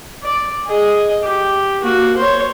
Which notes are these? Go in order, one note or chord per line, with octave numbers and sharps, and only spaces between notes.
D5
G#4 D#5
G4
A#3 F#4
C5 C#5